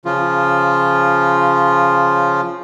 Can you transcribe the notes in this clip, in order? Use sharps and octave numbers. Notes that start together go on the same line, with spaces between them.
C#3 F3 F4